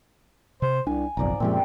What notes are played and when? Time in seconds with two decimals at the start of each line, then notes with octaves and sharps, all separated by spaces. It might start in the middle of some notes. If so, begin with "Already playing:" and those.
0.62 C3 C5
0.87 C2 D4 G#5
1.17 F#1 B1 F2 G#2 D5 A#5
1.40 F#2 A#2 F3 G#3 C4 G4